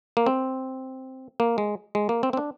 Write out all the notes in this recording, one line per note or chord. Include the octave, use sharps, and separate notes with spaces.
A#3
C4
A#3
G#3
G#3
A#3
C4
C4
D4